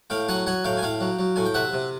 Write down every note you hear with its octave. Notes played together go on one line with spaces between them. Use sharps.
A2 F5 G5
F#3 F#5 G#5
F#3 F#5 G#5
A2 F5 G5
G#5
A2 F5 G5
F#3
F#3
A2 G#5
G5
C3 E5 F#5
C3